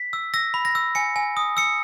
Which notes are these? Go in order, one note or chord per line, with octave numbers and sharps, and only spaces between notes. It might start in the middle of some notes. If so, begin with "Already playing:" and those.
Already playing: B6
E6
E6 A#6
B5
A#6
E6
G#5 C#7
G#5
D#6
E6 C#7